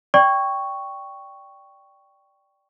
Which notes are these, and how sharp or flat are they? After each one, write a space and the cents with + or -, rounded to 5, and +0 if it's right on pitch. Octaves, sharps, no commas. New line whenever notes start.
D5 +0 G5 +0 C#6 +0